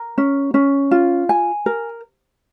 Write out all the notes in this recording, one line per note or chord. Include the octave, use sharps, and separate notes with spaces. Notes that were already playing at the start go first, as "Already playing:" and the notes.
Already playing: A#4
C#4
C#4
F4
G#5
A#4